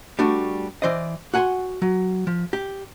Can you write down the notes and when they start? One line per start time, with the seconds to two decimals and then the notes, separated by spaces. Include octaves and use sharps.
0.19 G3 A3 D4 F#4
0.82 E3 C5 D5 D#5
1.34 F#4 F#5 G#5 B5 C6
1.82 F#3
2.27 F3
2.53 G4